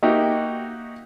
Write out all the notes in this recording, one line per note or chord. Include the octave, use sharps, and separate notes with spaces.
A#3 D#4 F#4 G4 E5